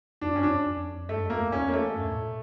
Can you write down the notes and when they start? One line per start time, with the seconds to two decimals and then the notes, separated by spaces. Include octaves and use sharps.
0.21 F2 D4
0.33 G2 C#4
0.43 F2 D4
0.66 F2
1.08 G2 A3
1.23 F2
1.30 A#3
1.37 F2
1.52 E2 C#4
1.68 A#3
1.74 A3
1.96 G2
2.06 A2
2.16 A#2